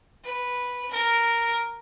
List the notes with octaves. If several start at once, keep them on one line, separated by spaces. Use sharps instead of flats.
B4
A#4